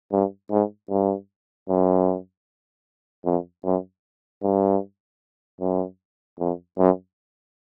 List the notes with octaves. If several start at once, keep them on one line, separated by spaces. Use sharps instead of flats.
G2
G#2
G2
F#2
F2
F#2
G2
F#2
F2
F#2